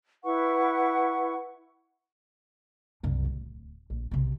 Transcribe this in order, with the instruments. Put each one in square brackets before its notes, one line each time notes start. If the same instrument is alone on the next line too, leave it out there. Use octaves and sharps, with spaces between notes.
[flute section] E4 B4 F#5 C#6
[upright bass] C2 F#2
D1
A#1
B1 C3